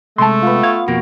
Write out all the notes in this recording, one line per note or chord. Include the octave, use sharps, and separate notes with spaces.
C3 G#3 A3 A5 C6
B3 F4
F5 C#6 G#6
F2 B2 A#3 F#4